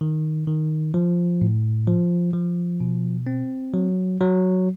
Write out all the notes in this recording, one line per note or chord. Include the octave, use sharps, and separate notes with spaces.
D#3
D#3
F3
A2
F3
F3
B2
C4
F#3
F#3